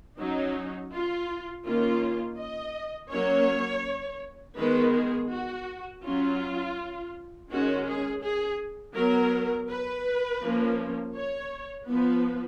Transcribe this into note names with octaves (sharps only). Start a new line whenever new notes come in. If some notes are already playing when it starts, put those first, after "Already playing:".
F#3 C#4 D#4
F4
D#3 A#3 C#4 F4
D#5
F#3 A#3 C#4 C#5
D#3 G#3 B3 B4
G#4
F#4
F#3 C#4 F4
D#3 G#3 C#4 F#4
G#4
G#4
F#3 B3 A#4
B4
F3 A#3 C#4
C#5
F3 B3 B4